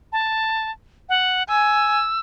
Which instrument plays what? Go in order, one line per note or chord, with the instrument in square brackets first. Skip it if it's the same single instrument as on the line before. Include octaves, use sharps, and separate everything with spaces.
[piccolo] A5
F#5
[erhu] G#5 [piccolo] E6